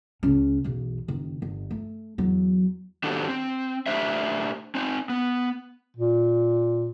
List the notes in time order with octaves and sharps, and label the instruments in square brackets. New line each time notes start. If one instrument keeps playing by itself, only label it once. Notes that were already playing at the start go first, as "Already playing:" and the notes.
[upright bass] C#2 C#4
B1 E2
F#1 D#3
G1
A3
E2 F#3
[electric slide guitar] D#3 D4 F#4 G4 A4
C4
A3 D4 G4 C5 E5
C4 D#4
B3
[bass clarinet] A#2